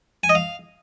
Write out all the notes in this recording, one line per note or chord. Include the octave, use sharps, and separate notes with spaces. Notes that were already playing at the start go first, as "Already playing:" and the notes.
G#5
D#5
F5